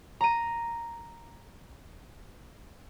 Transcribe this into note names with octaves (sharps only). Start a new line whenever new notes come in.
A#5 D#7